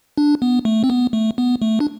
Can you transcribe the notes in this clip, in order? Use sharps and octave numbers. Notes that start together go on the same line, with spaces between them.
D4
B3
A3
C4
B3
A3
B3
A3
D4